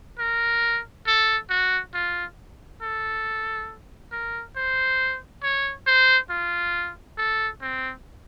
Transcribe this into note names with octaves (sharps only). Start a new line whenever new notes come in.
A#4
A4
F#4
F4
A4
A#4
C5
C#5
C5
F4
A4
C4